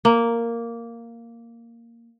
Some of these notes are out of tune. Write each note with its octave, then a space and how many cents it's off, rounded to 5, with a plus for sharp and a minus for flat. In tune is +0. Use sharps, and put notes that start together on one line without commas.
A#3 -5